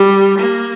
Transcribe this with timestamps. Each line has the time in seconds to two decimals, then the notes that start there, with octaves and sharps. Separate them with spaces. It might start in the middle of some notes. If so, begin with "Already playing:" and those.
Already playing: G3
0.39 A#3